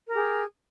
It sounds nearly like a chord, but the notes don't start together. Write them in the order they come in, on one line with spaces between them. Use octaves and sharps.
A#4 G4 G#4